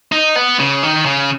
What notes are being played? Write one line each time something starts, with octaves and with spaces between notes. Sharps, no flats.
D#4
B3
C#3
D#3
C#3